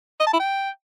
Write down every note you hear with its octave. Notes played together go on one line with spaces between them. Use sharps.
D#5
A5
E4
G5